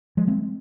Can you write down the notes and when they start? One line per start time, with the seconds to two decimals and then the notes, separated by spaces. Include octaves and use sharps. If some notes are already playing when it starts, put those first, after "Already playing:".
0.17 F3 G#3
0.27 G#3 C4